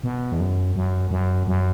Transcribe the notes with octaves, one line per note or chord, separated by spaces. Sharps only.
B2
E2
F#2
F#2
F#2
F#2